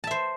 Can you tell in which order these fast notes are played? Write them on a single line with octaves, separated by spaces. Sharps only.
A5 E5 C5